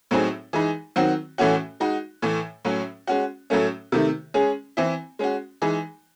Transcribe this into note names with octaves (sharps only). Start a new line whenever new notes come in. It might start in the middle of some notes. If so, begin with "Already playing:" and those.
A2 F#3 C4 D#4 G#4
E3 G#3 D#4 G#4
D#3 F#3 C4 F#4
A2 E3 A3 C#4 F#4
G#3 D#4 F#4
A2 E3 A3
A2 F#3 C#4
G#3 C#4 F#4
A2 F#3 A3 C#4
C3 D#3 A3
G#3 C#4 G#4
E3 C4 E4
G#3 C#4 F#4
E3 G#3 D#4 G#4